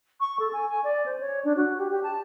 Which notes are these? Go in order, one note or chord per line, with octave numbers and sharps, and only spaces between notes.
C#6
A4
G#5
G#5
D5
C5
C#5
D4
F#4
G4
G4
A5